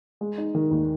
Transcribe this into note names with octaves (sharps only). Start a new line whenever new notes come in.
G#3
D#4
D#3
D#2